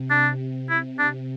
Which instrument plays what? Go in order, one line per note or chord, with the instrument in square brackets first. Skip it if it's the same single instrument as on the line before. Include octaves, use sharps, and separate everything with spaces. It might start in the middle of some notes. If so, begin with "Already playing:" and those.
Already playing: [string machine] C3
[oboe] D4
E4
D4